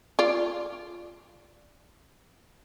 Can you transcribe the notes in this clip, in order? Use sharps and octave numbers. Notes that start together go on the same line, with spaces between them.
F4 D5